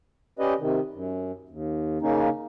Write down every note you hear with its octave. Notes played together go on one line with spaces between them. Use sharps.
C#4 G4 B4 D5 D#5
C3 D#3
F#2
D#2
C#3 A#3 C#4 D#4